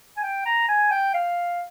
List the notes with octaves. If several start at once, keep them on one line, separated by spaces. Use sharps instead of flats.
G#5
G5
A#5
G#5
G5
F5